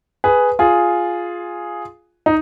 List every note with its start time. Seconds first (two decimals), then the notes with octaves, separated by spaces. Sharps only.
0.24 G#4 B4
0.59 F4 G#4
2.26 D#4